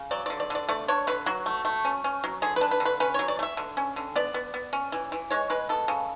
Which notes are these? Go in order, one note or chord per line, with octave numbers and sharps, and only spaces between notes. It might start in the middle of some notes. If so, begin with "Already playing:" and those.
Already playing: C#3
F#3 D5
D3 D5
D5
D3 D5
A3 D5
D4 C#5
D3 B4
F#3 F#4
A3
A3
C#4
C#4
F#3
D3 G#4
B4
D4
B4
D3
B4
C#4 B4
F#3 C#5
D5
A3
E5
D3
C#4
D3
B3 D5
B3
B3
C#4
E3
E3
G#3 C#5
G#3 B4
B3 A4
C#3